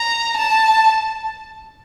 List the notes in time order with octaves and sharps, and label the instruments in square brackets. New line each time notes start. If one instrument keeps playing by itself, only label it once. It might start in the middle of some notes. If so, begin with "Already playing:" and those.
Already playing: [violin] A#5
A5